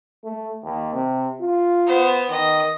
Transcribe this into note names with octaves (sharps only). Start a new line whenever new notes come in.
A3
D#2
C3
F4
B3 C5
D#3 D#5